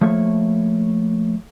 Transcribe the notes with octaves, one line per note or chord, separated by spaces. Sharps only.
F3 A3 A#3 C#5